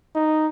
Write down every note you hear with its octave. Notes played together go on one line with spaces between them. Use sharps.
D#4